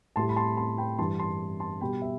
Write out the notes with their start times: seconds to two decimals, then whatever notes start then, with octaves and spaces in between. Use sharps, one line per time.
0.16 A2 G3 A5 C6
0.29 B5
0.36 A5 C6
0.57 A5 C6
0.78 G5 B5
0.98 G2 E3 G3 A5 C6
1.19 A5 C6
1.60 A5 C6
1.81 B2 G3 G5 B5
2.02 E5